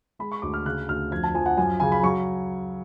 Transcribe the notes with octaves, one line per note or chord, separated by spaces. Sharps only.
G#3 B5
C#6
D2 D6
F6
C#3 F#6
D2 F6
F2 G#6
A5
F3 G#5
F#5
F#2 G#5
C#3 G#5
B5
F#3 C#6